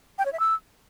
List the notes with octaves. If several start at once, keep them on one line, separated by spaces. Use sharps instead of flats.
G5
C#5
E5
E6